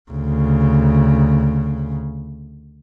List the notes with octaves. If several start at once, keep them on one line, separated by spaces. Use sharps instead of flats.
D2 C#3